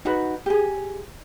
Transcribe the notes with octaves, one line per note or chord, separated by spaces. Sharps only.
D#4 F#4 B4
G4 G#4